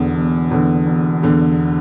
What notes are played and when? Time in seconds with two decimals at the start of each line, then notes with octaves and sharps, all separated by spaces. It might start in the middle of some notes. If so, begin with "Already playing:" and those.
Already playing: E1 E2 D3
0.15 E1
0.51 E2 D3
0.86 E1
1.23 E2 D3